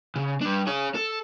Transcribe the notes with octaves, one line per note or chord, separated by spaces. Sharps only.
C#3
G3 D4
G#4 C#5
A4